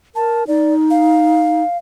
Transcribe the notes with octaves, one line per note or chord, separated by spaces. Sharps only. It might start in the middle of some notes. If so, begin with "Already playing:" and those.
A#4 A5
D#4 D5
F5